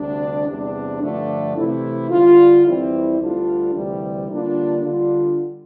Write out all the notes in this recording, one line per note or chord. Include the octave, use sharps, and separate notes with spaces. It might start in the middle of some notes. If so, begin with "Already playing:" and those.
Already playing: D2 C3 G3 D4
E2 C3 G3 D4
G2 D3 F3 A3 D4
C3 E3 A3 E4
D3 G3 D4 F4
F2 E3 G3 C4 E4
D2 D3 G3 D4 F4
D2 C3 E3 G3
D3 G3 A#3 D4 F4
D3 G3 D4 F4